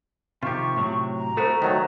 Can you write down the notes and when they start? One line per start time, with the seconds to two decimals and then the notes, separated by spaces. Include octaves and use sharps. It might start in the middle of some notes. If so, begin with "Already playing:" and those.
0.43 C3 D#3 F3 F4 G4 C#6
0.76 A2 C3 F#3
1.17 A#5
1.37 A3 E4 F#4 A4 C5
1.62 D#3 F#3 A3 D#5